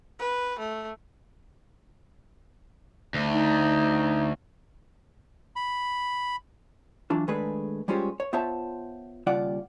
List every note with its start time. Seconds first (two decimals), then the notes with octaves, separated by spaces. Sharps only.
0.19 B4
0.59 A3
3.14 D2
3.31 D#4
5.56 B5
7.10 E3 F#3 D4 F4
7.28 D#3 G#3 A3 D4 G#4 B4
7.88 G3 G#3 C#4 F4 G4 C5
8.20 C#5
8.33 B3 F4 C5 C#5 E5 A5
9.27 D#2 C#3 G3 F4 D5 F#5